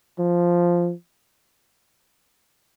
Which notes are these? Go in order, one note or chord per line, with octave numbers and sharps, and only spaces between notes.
F3